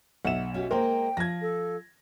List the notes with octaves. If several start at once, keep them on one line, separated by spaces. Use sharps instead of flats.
B1 E5 F#5 E7
C#4 F#4 G4
G#3 A#3 A#4 C5 G5
F3 G#6 A#6
A4